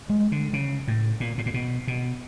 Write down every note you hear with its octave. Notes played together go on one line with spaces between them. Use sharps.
G#3
D3
C#3
A2
A#2
A2
A#2
B2
B2